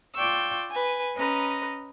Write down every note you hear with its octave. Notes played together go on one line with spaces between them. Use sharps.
F4 D5 G5 C#6 E6
B4 G#5
C#4 B4 D#5 A#5